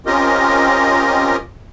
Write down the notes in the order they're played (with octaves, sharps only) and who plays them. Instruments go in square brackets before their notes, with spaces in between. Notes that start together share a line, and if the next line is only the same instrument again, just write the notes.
[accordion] C4 C#4 F4 G4 A#4 D#5